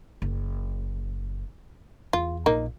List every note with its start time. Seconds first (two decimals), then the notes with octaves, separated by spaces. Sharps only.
0.22 F#1
2.13 E2 F4
2.46 A#1 A#3 D#4